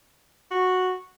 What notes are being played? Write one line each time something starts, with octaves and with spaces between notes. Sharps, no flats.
F#4